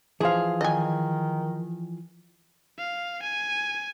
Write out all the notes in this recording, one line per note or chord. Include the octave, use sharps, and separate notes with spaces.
E3 F3 G#4 F5
D#3 D#5 G#5
F5
G#5